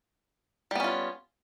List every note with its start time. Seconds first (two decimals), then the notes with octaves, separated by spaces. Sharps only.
0.71 G3
0.75 B3
0.80 C#4
0.84 F4